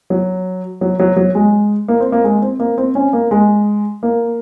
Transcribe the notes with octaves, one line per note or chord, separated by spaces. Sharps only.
F#3
F#3
F#3
F#3
G#3
A#3
C4
A#3
G#3
C4
A#3
C4
C#4
A#3
G#3
A#3